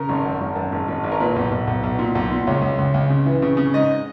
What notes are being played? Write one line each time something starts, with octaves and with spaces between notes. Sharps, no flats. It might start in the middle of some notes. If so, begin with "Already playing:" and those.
Already playing: C#3 A#4
G#1
F#2
G#1
F#2
G#1
G#1
G#1
A#4
A#2 B4
B1
B1
B1
B1
A#2
B1
A#2
C#2 C#5
C#2
C#2
C#2
C#3
E3
C#3
C#3
G#2 D#5